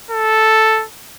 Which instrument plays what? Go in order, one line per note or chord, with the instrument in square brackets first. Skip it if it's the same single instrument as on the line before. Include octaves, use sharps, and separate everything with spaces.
[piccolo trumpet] A4